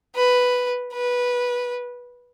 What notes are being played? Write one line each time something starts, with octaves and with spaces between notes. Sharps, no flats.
B4
B4